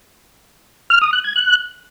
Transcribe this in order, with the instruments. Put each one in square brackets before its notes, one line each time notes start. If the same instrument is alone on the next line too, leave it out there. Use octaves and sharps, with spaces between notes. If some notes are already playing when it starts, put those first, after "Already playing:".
[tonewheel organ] F6
D#6
F#6
G#6
F#6